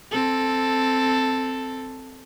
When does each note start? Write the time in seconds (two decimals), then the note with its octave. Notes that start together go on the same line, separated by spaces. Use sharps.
0.11 C4 A4